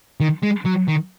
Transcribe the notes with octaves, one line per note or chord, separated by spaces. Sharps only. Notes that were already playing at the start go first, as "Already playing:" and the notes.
D#3
G#3
F#3
D#3